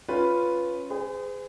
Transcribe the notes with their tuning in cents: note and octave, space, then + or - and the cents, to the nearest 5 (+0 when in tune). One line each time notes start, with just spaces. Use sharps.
C#4 +0 F4 +0 B4 +0
G#4 -10 C5 -45